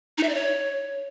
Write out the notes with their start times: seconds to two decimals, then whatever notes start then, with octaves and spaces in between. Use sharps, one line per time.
0.18 D#4
0.23 E5
0.29 D5
0.35 C#5